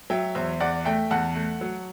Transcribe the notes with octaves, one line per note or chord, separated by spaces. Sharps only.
F#3 E5 G5
E2 C5 E5
E2 D5 F#5
A3 E5 G5
E2 F#5 A5
A3
F#3